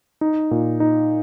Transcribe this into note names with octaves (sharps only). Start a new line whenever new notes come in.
D#4
A#2
D#4